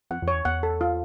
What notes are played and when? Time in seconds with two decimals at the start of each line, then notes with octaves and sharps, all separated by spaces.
0.10 F2 F#5
0.22 F2
0.28 C#5
0.34 E2
0.45 E2 F#5
0.63 A4
0.81 F4